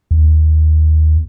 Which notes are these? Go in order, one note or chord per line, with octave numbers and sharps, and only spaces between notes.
D#2